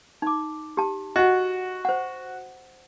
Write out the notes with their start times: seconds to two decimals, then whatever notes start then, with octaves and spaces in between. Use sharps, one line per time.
0.22 D#4 D6
0.77 G4 A5
1.16 F#4 D#5 F#5
1.85 C5 F#5